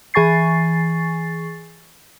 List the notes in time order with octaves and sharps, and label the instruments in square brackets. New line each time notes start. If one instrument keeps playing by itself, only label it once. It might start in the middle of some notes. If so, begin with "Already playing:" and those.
[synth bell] E3 G#4 G#5 C#6 A6 C7